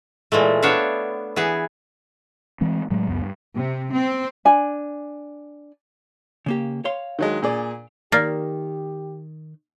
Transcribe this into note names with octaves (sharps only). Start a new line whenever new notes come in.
A#2 E3 G#3 A3
B3 D4 C#5 E5 F5
E3 B3 G#4
E3 G#3 C4
A2 F#3 G#3
C#2 F#2 B3
G2
C3
C4
D4 G#5
C#3 A#3 G4
C#5 F5 C6
D#3 F#3 G#3
A#2 G#4 D5
D#3 A#3 G4 D5 F6 A6